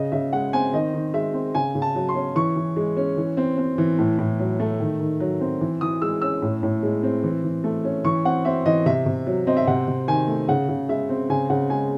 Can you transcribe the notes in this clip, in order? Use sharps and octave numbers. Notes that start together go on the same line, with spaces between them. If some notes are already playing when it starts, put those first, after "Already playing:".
Already playing: C#3 D#5
C#3 E5
G#3 F#5
C4 G#5
D#3 D#5
D#3
G#3 E5
C4
C#3 G#5
C#3
A5
F#3
C6
C#4
E3 C#6
E3
G#3
C#4
E3
C4
C4
E3
A2
A2
F#3
A3
D#3
D#3
F#3
C4
E3
E3 D#6
G#3 E6
C#4 E6
A2
A2
G#3
C4
E3
E3
A3
C#4
E3 C#6
C4 F#5
C4 E5
E3 D#5
C3 E5
C3
F#3
C4 D#5
E5
C3 F#5
C3
D#3 G#5
A3
C#3 F#5
C#3
G#3 E5
C4
C#3 G#5
C#3 F#5
G#3 G#5